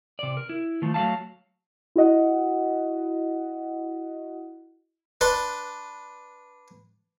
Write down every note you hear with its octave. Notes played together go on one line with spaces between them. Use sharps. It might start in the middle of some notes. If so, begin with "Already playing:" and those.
C3 D5
A#4
E4
D#3 F3 A3
F#3 A3 E5 F5 A5
E4 F#4 D#5 F#5
D4 B4 C6